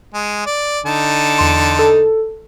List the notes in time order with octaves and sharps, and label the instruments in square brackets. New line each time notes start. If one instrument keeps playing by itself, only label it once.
[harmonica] G#3
D5
D3 D#4 A5
[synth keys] E2 C6
A4